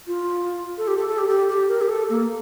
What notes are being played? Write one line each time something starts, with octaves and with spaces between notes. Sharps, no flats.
F4
A4
G4
A4
A4
G4
G4
G4
A#4
G4
A4
A#3